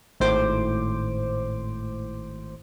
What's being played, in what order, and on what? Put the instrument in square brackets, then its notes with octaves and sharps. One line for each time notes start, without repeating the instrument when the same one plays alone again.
[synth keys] G#1 A2 C5 D6